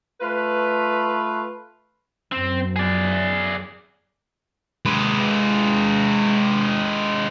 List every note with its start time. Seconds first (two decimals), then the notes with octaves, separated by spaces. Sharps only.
0.21 A3 F4 B4
2.32 F#2 C4
2.76 G#4 D5
4.85 G#3 B4